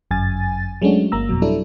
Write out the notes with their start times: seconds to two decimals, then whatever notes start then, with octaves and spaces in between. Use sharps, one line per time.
0.11 G1 F#2 G#5 A6
0.82 F#3 G#3 A3 C#4 D4 F#4
1.12 G1 A#3 A#5 E6
1.29 F2 B2 F#3
1.42 F#3 G3 D4 E4 A4